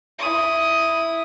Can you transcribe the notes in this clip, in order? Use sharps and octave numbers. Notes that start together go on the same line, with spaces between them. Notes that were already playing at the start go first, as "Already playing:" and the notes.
E4 D#6